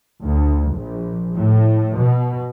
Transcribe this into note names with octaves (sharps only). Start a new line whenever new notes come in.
D2
A#1
A2
B2